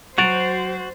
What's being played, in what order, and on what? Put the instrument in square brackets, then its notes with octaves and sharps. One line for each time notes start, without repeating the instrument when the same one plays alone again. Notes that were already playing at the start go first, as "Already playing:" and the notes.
[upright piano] F#3 A6 [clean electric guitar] F#4 [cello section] C5 [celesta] D7 F7